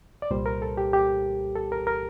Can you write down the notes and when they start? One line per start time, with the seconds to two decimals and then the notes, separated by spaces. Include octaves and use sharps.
0.22 D5
0.30 C2 A#2 G3 C5
0.46 A#4
0.62 A4
0.77 G4
0.93 G4
1.56 A4
1.72 A#4
1.87 A#4